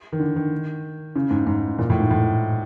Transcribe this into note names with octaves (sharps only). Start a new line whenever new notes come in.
D#3
D3
D#3
C#3
G#2
G#2
A#2
A2
G#2
A2